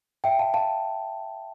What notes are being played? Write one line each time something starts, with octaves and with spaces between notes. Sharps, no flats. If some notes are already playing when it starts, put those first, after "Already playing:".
E5 G5
F5 A5
F5 A5